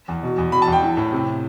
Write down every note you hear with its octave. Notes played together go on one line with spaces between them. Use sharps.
E2
B2
E2
B2 B5
A5
E2
G5
E3
A2
C3